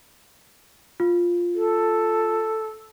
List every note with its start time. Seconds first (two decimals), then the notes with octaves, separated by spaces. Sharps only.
1.00 F4
1.55 A4